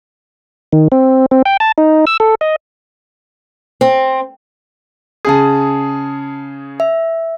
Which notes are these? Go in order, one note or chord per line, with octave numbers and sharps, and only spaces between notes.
D#3
C4
C4
G5
A5
D#4
E6
A4
D#5
C4
C#3 G#4 A5 D#6
E5